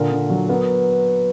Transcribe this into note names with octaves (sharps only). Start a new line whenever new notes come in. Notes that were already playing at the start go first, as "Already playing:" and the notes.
Already playing: A#2 D3 A#4
D3
F#3
B3 A#4